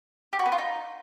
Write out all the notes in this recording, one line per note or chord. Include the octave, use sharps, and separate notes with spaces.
G4
F#4
B3
F4
D#4